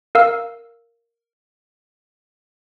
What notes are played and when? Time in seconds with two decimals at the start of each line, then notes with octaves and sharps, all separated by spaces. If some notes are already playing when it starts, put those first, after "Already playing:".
0.15 A#4 F5 E6